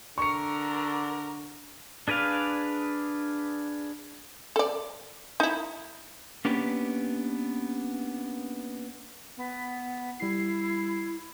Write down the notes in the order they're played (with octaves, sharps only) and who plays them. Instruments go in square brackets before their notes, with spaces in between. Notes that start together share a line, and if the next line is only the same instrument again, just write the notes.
[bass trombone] D3 [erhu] A#4 [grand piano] C#6 C#7
[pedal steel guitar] D4 G#4 B4 D5 F5
[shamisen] A4 D5
D#4 E4
[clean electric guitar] A#3 B3 C#4 D4 G4 B4
[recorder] B3
[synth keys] G3 C7 [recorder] E4